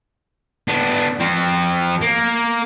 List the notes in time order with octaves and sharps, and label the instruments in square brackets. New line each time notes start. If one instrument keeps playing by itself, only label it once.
[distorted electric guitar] B3 D4
F3 C4
A#3